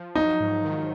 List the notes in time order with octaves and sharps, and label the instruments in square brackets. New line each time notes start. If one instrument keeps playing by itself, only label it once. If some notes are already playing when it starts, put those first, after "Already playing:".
Already playing: [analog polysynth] F3
[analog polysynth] F#3 [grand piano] D#4
[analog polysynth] G#2
D#3